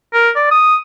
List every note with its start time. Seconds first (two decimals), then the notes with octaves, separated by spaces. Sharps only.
0.14 A#4
0.36 D5
0.51 D#6